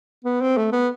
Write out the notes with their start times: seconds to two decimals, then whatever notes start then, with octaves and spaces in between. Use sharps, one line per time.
0.25 B3
0.41 C4
0.57 A3
0.72 B3